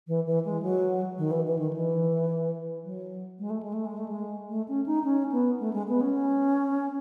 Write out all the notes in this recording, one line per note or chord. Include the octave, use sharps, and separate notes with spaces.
E3
E3
G#3
F#3
D#3
E3
E3
D#3
E3
F#3
G#3
A3
G#3
A3
G#3
A3
G#3
A3
C#4
D#4
C#4
B3
A3
G#3
B3
C#4